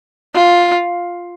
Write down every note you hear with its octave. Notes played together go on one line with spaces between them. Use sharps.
F4